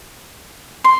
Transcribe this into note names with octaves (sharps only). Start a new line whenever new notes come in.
C6